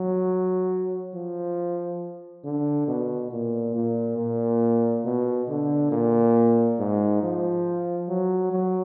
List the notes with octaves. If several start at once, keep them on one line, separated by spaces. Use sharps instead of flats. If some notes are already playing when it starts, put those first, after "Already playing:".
Already playing: F#3
F3
D3
B2
A#2
A#2
A#2
B2
D3
A#2
G#2
F3
F#3
F#3